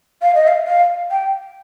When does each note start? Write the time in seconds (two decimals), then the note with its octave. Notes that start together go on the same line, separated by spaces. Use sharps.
0.22 F5
0.35 D#5
0.48 F5
0.67 F5
1.11 G5